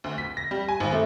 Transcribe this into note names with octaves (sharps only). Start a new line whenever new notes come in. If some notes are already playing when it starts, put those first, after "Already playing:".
D2
B6
A#6
G3
G#5
G#1
A3